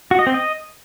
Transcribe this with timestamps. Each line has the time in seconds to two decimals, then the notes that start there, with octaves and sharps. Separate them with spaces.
0.11 F#4
0.19 D#5
0.27 C4
0.34 D#5